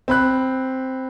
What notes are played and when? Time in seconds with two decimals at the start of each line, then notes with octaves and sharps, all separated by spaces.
0.08 C4 B5 F#6